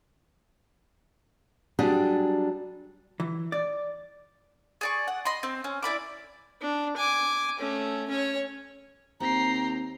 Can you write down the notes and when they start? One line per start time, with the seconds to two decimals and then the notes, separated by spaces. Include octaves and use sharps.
1.79 F#3 G3 D4 G4 G#4
3.20 E3
3.52 D5
4.81 G#4 D5 C#6
5.08 F#5
5.25 D#5 B5 C6
5.43 C4
5.64 C#4
5.83 E4 D5 B5 D6
6.61 D4
6.97 G#5 D6
7.59 A3 C#4
8.08 C#4 C#5
9.20 D#2 C4 G5 A#5 C7